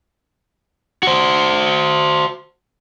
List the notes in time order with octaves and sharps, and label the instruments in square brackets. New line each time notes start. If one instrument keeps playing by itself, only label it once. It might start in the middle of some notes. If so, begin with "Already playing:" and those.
[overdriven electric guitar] F#4 C5